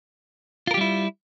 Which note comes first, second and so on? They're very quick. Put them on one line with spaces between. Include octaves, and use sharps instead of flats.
F4 A#4 G4 G3 E4